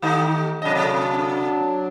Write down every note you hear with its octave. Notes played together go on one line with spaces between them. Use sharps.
D#3 A3 D#4 G4
C3 F#3 D4 D#5
C3 A3